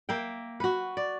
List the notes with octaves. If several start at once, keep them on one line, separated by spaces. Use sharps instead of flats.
A#3 E5 G5
F#4 B4
D5